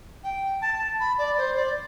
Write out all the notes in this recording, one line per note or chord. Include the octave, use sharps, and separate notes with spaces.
G5
A5
B5
D5
C5
D5